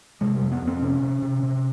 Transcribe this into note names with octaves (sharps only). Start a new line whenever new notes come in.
C3 G#3
G3
F2
B3
F2
C4
C3 C#4
C3
C3
C3